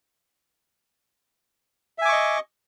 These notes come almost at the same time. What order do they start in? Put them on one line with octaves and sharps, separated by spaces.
E5 G#5 D6 C#6 D#5